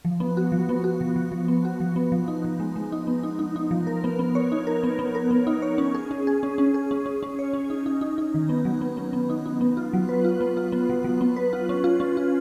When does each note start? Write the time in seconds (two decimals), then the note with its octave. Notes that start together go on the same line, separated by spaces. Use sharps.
0.05 F3
0.20 B3
0.37 F#4
0.52 F3
0.69 B3
0.84 F#4
1.01 F3
1.16 F3
1.32 F3
1.48 B3
1.65 F#4
1.80 F3
1.96 B3
2.12 F3
2.28 D#4
2.45 F3
2.60 G#3
2.76 G#3
2.92 D#4
3.07 B3
3.23 D#4
3.39 D#4
3.56 D#4
3.71 F3
3.87 A#4
4.04 B3
4.19 B3
4.35 C#5
4.52 D#4
4.67 A#4
4.84 B3
4.99 B3
5.15 A#4
5.31 B3
5.47 D#4
5.62 C#5
5.78 C#4
5.95 G#4
6.11 C#4
6.27 G#4
6.43 C#4
6.58 C#4
6.74 G#4
6.91 C#4
7.06 C#4
7.23 C#4
7.39 C#5
7.54 C#4
7.70 D#4
7.86 D#4
8.01 D#4
8.18 D#4
8.34 D#3
8.49 B3
8.65 F#3
8.81 B3
8.97 B3
9.13 B3
9.30 D#4
9.46 D#4
9.61 B3
9.77 F4
9.93 F#3
10.09 B4
10.25 F4
10.41 B3
10.57 F4
10.72 B3
10.90 F#3
11.04 F#3
11.21 B3
11.36 B4
11.53 F4
11.69 C#4
11.84 F4
12.00 C#4
12.17 F4